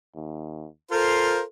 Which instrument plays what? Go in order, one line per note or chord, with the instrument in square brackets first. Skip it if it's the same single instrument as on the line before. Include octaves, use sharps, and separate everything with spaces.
[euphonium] D#2
[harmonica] F4 A#4 C5 [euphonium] A4